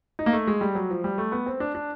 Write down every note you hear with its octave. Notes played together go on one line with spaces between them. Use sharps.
D#4
A#3
A3
G#3
G3
F#3
F3
G3
A3
B3
C4
D4
D4